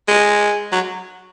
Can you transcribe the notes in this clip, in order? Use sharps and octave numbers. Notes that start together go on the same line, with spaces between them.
G#3
F#3